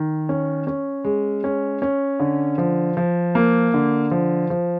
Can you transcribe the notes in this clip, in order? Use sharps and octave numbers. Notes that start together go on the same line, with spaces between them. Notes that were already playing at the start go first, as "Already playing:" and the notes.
Already playing: D#3
C#4
C#4
G#3
C#4
C#4
D3
F3
F3
A#3
D3
F3
F3